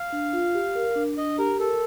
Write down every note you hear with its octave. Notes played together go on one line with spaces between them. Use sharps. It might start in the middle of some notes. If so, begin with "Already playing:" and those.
Already playing: F5
D4
F4
G4
A#4
D4
D4 D#5
G4 A#4
A4 A#4